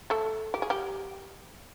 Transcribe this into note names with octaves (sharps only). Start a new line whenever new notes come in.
A3 A4
G4
G#4
G3 G4